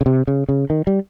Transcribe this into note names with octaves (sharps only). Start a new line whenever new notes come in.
C#3
C3
C#3
C#3
D#3
G3